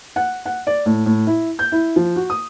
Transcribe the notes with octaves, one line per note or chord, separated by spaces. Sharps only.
F#5
F#5
D5
A2
A2
E4
G6
E4
F3
F#4
D#6